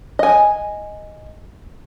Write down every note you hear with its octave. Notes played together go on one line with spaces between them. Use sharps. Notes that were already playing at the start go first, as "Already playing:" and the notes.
D#5 G#5